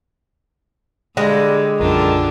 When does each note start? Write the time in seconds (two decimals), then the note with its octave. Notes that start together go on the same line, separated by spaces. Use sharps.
1.17 D3 G3 G#3 A#6
1.80 B1 F#2 D3 D#3 D4 F4